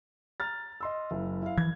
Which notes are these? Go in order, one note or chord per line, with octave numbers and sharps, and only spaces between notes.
A#5 F6 A6
D#5 C6 E6
F#1 E4
E4 F5
E3 F3 G#6